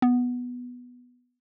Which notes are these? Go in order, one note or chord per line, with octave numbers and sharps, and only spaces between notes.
B3